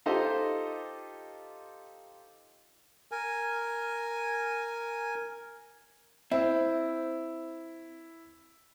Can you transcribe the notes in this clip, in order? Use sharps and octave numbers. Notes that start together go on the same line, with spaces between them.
D#4 F4 G4 A4 C5 D#5
A#4 G#5
C4 E4